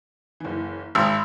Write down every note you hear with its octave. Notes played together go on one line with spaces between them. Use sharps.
F#1 E3
G#1 B5 C6 E6